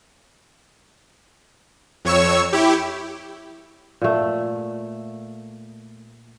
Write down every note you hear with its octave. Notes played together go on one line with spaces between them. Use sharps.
F2 C#5 C#6 E6
E4 G4
A#2 A3